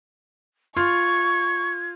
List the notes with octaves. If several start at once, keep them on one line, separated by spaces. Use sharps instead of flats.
F4 C6 C#6 F6 G#6